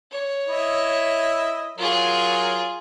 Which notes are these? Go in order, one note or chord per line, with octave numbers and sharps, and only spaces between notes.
C#5
E4 D#5 E5
F#3 F4 G#4 A#4 C#5